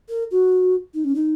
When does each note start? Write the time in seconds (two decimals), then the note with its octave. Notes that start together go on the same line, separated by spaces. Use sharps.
0.09 A#4
0.31 F#4
0.94 D#4
1.04 C#4
1.15 D#4